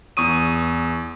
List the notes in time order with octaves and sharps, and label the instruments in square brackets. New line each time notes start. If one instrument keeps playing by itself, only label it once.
[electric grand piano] E2 C#6 D#6 D#7